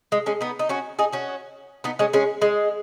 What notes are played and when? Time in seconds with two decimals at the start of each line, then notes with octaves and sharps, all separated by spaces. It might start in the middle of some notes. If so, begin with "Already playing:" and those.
0.12 G#3
0.26 G#3 C#4
0.41 B3 D#4
0.59 D#4
0.69 C#4 F#4
0.99 D#4 G#4
1.13 C#4 F#4
1.84 B3 D#4
1.99 G#3 C#4
2.13 G#3 C#4
2.42 G#3